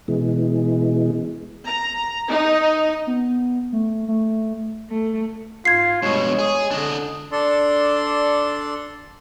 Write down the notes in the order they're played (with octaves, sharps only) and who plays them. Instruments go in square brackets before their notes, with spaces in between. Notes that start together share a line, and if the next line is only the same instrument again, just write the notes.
[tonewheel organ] B2 E3 G#3
[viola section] A#5
D#4
[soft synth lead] B3
A3
A3
[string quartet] A3
[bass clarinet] G#2 [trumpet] F4 [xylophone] G#6 C7
[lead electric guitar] G2 B2 [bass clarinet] G#3 [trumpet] C#5
[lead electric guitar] G#4
[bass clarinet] D3 [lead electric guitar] D4 D#5
[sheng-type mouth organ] D4 A4 D5 C6